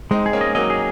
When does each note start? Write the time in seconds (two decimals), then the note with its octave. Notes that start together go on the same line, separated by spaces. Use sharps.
0.11 G#3 C4 D#4
0.26 G#4
0.33 A#3 C#4
0.41 D#5
0.55 F#3 A#3 D#5
0.70 G#4